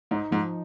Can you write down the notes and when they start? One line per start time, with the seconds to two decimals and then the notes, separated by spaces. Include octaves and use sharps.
0.11 G#2 D#4
0.31 G#2 F3